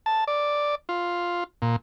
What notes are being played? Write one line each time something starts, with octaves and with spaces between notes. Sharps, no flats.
A5
D5
F4
A#2